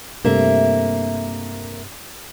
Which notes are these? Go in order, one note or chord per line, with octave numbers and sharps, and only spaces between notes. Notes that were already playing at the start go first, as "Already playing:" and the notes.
G2 C3 A3 A#3 E5